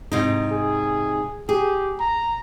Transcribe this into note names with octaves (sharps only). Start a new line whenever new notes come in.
G#2 C3 D#4
G#4
G4 G#4
A#5